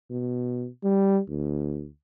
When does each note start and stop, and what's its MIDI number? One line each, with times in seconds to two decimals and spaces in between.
0.10 0.67 47
0.84 1.20 55
1.29 1.88 38